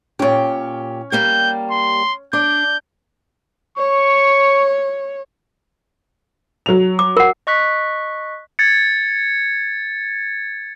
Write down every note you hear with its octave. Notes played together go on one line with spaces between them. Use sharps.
A#2 C#4 G4 C#5
G3 A#3 G4 G6
C6
D4 D6 G6
C#5 C#6
F#3 F7
D6
A#4 F#5
D#5 C#6 F#6 B6
G#6 A6 C#7